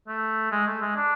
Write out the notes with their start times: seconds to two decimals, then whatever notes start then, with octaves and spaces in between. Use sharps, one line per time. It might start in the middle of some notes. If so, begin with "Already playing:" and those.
0.08 A3
0.52 G#3
0.67 A3
0.81 G#3
0.96 D4